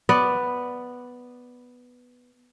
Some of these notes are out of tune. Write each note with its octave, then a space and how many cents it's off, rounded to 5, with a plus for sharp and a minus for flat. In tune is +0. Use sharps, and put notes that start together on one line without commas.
B3 +0 D5 +0